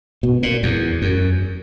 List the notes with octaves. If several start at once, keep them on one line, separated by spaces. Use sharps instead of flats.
B2
A#2
E2
F#2